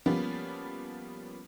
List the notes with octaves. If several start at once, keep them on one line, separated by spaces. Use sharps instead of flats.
F3 G3 A#3 B3 C#4